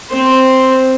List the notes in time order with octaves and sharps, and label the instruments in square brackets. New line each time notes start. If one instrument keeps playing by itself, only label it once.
[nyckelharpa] C4 C5